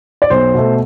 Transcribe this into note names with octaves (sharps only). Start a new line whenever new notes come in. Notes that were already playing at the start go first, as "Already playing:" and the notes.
D5
B1 C5
B2 A3